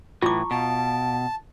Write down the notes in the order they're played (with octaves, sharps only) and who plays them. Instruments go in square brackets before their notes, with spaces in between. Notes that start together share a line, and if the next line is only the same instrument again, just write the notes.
[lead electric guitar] A2 E3 [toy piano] F4 D6 [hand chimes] A5 A#5 C#6
[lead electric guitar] B2 [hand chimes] F5 D7 [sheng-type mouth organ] A5